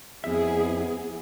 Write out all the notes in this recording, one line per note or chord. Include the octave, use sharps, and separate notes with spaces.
F2 B3 E4 G#4 E5